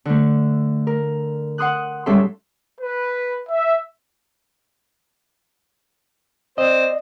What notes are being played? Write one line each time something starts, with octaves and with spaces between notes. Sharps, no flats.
D3 A3
A#4
F#5 C6 D#6 F#6
G#2 G3 C#4 A4 E5 C6
B4
E5
C4 C5 D5 D#5